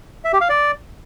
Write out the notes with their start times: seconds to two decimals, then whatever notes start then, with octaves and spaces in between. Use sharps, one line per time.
0.25 E5
0.33 G4
0.41 F5
0.49 D5